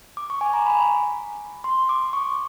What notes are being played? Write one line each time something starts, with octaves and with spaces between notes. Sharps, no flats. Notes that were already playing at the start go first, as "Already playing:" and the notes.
D6
C#6
G#5
A#5
B5
C6
D6
C#6